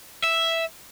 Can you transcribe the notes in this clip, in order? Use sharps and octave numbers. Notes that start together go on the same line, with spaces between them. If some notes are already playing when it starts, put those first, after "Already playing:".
E5